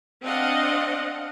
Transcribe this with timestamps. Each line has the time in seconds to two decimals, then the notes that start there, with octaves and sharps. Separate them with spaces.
0.23 C4 D4 D#5 F5 F#5